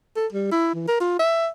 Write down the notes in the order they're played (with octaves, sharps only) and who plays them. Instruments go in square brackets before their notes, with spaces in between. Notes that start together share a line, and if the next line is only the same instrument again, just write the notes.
[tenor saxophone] A4
G3
E4
E3
A#4
F4
E5